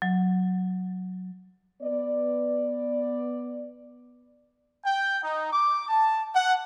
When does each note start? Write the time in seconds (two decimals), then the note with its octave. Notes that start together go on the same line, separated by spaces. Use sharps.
0.02 F#3
1.82 B3 D5
4.83 G5
5.21 D#4
5.51 D6
5.88 A5
6.33 F#5